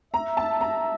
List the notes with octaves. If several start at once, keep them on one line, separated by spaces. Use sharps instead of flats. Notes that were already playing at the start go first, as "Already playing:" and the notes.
E5 A#5
A5
A#5